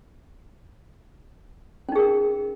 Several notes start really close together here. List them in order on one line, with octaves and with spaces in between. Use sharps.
C#4 D#4 G#4 A#4